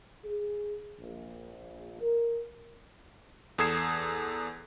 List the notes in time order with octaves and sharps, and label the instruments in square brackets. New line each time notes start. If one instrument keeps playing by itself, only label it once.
[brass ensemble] G#4
A#1
A#4
[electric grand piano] E2 A4 D#6 G#6 C7 E7